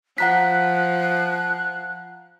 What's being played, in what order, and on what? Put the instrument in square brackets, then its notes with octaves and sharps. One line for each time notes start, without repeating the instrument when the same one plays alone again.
[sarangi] F3 [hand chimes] F#5 A#5 B6 [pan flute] F#6